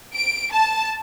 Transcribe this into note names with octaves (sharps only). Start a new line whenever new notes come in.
D7
A5